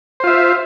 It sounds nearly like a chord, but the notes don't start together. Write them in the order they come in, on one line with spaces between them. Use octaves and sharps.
C5 F4 E5